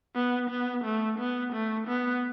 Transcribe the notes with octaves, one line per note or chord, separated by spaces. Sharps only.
B3
B3
A3
B3
A3
B3